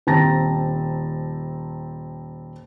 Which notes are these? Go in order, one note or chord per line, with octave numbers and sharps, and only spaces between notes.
D#1 C4 A5 A#5 A6 A#6